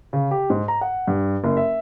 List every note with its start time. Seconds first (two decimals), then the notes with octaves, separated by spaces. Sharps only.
0.13 C#3
0.31 G4
0.50 G#2
0.68 A#5
0.81 F#5
1.07 G2
1.44 F#1
1.57 E5